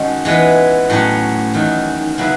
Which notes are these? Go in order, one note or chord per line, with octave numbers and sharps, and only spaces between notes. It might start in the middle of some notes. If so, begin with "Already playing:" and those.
Already playing: D#3 G#3 C#4 F#4 A4
E3 G#3 B3
A2 F#3 C#4
E2 D#3 F#3
C#3 F#3 B3 E4